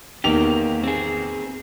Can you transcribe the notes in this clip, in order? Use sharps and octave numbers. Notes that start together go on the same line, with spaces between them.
E2 D#3 A#3 G4 F7
C4 G#4